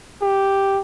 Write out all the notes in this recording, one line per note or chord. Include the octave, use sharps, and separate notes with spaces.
G4